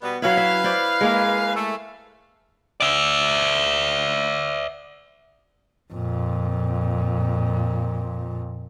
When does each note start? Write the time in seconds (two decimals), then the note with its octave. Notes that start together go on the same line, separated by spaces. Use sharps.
0.01 B2 G3 B3
0.22 F#3 C#4 E4 B4 F5
0.37 E5
0.64 E4 C5 D5
1.01 G#3 A#3 G#4
1.55 A3
2.80 D5 E5
5.93 F2 A#2